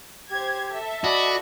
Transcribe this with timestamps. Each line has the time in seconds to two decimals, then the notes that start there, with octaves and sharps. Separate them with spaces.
0.31 G4 C5 G#6
0.71 A4 E5 A5
1.04 F#4 D5 D#5 B5